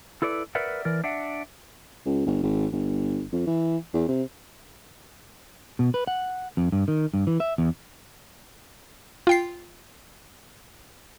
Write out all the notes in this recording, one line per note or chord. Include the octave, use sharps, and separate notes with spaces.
E4 A4 B4 D5
A#4 B4 D5 E5 F#5
E3 A#4 D5
D4 E5 F#5
C#2
G1
G#1
G1
F2
E3
E2
C3
B2
B4
F#5
F2
G2
D#3
G2
E3
E5
E2
F4 G5 C7